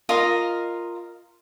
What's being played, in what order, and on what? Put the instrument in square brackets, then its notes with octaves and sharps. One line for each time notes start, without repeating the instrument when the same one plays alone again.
[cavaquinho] F4 A#4 D#5